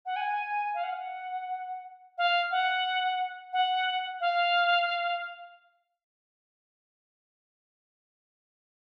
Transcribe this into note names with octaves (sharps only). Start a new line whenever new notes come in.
F#5
G#5
F5
F#5
F5
F#5
F#5
F5